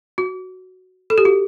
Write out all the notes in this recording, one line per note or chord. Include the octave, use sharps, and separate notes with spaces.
F#4
A4
G4
F#4